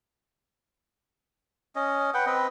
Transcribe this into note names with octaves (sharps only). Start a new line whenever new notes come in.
C#4 D#5
B4 F#5 G5
C4 B4 D#5